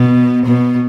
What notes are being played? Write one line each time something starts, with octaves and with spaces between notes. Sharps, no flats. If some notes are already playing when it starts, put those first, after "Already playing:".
Already playing: B2
B2